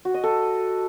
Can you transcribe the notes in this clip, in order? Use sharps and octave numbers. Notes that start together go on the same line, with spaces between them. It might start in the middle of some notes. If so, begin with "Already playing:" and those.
F#4
D#5
A4